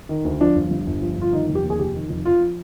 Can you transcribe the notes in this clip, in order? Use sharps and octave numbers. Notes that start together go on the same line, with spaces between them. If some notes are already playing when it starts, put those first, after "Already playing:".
D#3
D2
F3 D4
G1
G2
G1
F3
G1 F4
D#3 D#4
F1
G4
D#2
G#4
F1 G4
D#3
F1
F3 F4